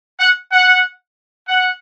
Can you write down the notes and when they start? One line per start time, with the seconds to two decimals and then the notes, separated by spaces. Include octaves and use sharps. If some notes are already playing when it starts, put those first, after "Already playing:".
0.20 F#5
0.52 F#5
1.48 F#5